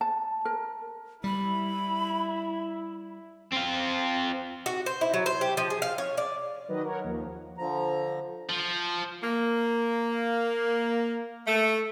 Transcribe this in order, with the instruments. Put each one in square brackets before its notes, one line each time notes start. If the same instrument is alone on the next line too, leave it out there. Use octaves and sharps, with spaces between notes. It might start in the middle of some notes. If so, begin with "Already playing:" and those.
[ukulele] A5
A#4
[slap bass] G3 [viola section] E4 [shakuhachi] B5
[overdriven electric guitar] C4 F4
[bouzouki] F#4
C5
E4
F#3
C5
G4
F3
G#4
F5
C#5
D5
[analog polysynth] D#3 F#3 B4 D#5
A#4 C#5 F#5
D#2 F3
[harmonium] D3 F3 A#5
[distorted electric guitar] F3
[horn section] A#3
A3